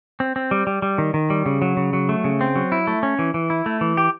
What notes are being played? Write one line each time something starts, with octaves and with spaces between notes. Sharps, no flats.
C4
C4
G3
G3
G3
D#3
D#3
G3
C#3
F#3
C#3
F#3
A3
C#3
C4
F#3
E4
A3
C#4
E3
E3
E4
A3
E3
G4